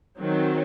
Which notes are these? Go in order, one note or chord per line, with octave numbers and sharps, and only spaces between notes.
D#3 F#3 C4